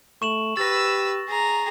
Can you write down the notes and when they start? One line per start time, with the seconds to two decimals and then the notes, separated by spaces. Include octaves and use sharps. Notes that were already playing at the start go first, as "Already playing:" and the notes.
0.22 A3 C#6 E7 F#7
0.57 G4 B4 E6 A6 A#6
1.28 G#4 A#5